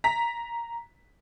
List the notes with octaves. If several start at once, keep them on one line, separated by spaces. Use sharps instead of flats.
A#5 B6